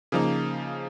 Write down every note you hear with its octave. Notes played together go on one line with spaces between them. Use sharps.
C#3 F3 A#3 D#4